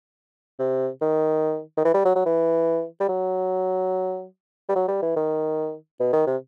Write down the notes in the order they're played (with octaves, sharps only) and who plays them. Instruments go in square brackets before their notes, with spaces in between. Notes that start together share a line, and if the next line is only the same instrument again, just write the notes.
[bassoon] C3
D#3
D#3
E3
G3
F#3
F#3
E3
G3
F#3
G3
F#3
G3
E3
D#3
B2
D#3
C3